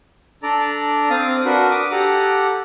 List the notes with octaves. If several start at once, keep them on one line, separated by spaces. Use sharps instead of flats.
D4 A4 D5 A#5
C4 F5 D#6
D4 F#4 A#4 B4
D6 D#6
G4 A4 F#5 A#5